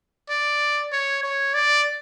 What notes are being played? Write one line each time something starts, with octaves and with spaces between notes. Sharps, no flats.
D5
C#5
C#5
D5